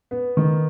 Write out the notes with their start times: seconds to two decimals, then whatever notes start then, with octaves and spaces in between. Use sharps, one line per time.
0.11 B3
0.37 D#3